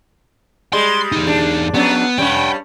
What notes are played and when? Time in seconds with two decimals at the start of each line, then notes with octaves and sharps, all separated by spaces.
0.73 G3 G#3 C6
1.12 E2 D#4
1.27 D4
1.74 F2 F#3 B3 D4
2.18 G2 G3 C#4 F#5 G5